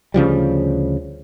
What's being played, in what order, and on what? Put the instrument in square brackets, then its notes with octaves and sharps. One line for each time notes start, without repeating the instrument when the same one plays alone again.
[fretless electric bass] D2 C#3 F3 G3